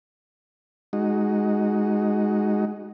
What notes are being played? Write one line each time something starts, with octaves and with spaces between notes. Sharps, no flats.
G#3 D#4 F#4